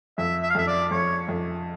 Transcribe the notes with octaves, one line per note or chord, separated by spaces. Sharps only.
F2 E5
E5
F5
F2 E5
D5
F2 C#5
F2